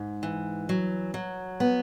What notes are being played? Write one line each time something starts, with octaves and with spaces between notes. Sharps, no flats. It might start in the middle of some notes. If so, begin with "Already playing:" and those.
Already playing: G#2
E3
F#3
F#3
B3